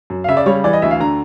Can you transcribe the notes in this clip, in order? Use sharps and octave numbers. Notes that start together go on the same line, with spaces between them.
F#2
F5
C#3 E5
D5
G3 C#5
E3 D5
D#5
D2 E5
F5
D3 A#5